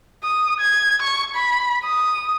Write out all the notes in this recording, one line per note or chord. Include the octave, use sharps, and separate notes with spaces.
D#6
G#6
C#6
B5
D#6